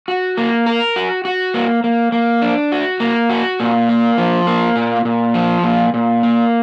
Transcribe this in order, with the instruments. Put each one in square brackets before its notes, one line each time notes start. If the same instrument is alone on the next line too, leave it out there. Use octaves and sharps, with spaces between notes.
[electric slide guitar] F#4
A#3
A#4
F#4
F#4
A#3
A#3
A#3
D4
F#4
A#3
F#4
A#2
A#3
F3
A#3
A#2
A#2
F3
A#2
A#2
A#3